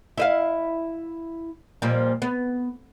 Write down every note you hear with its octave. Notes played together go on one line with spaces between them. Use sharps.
E4 D#5 F5
A#2 F3 G3
B3